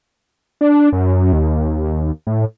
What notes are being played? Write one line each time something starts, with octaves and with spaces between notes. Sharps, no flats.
D4
F#2
D#2
A2